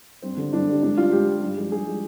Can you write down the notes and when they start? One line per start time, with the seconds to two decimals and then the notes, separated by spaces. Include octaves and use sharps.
0.22 G2 C4
0.37 D3 G3
0.53 G2 D4
0.67 D3 G3
0.82 G#2 D4
0.97 G3 F4
1.12 G#2 G4
1.27 G3
1.42 G2
1.57 F3 G#3
1.72 G2 G#4
1.87 F3 G#3